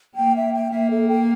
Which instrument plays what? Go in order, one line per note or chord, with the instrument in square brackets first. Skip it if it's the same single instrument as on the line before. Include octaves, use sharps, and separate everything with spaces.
[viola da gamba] A#3 [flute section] G5
[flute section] E5
G5
[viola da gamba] A#3 [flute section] E5
[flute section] A4
G5